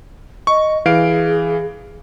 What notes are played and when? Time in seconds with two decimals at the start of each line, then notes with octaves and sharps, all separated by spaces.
0.47 D#5 C#6
0.86 E3 G#4 F5 D7